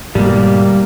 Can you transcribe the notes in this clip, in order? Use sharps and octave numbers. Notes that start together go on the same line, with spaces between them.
G#2 B2 D3 G3 A#3